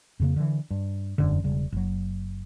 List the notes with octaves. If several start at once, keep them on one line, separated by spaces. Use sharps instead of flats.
F2 C#3 A#3
D3 E3
G2
E1 F#2 D3
E1 C#3 G3
F#1 F#3